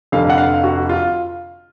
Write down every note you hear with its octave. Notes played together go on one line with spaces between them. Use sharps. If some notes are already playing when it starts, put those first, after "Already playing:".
F1 F2 D3 F5
F#5
F5
F#4
F4